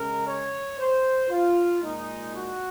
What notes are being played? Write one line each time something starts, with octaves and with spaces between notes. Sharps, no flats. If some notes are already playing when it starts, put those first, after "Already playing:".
Already playing: C#3 G#3 A#4
C#5
C5
F4
A#2 G#3 D#4
F#4